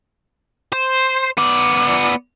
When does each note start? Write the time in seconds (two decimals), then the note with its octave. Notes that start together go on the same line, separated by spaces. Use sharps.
0.73 C5
1.37 B3 D5